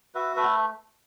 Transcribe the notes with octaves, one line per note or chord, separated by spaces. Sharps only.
F#4 B4 E5
A3 B4 E5